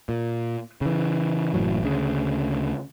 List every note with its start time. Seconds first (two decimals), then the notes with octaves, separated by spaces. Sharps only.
0.09 A#2
0.81 C#3 E3
1.54 F#1 A2 E3 F#3
1.83 D2 C#3